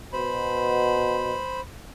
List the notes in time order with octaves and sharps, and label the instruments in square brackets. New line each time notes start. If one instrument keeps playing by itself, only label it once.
[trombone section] B2 [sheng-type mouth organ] C5 B5